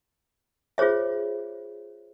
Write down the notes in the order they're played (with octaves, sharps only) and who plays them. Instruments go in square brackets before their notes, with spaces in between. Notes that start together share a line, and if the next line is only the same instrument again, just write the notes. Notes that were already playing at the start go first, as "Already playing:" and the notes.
[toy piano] F4 G#4 C5 C#5 E5